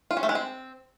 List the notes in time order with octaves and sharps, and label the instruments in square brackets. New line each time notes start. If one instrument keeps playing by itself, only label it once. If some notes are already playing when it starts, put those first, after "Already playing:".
[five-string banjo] F4
C#4
A3
G#3
C4